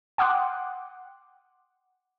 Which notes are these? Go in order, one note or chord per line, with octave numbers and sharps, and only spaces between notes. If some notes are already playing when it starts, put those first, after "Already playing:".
F#5 G5 C6 D6 D#6 F#6